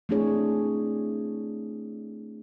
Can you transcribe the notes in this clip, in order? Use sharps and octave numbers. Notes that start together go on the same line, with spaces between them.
A3 C4 D4 E4 G#4 C#5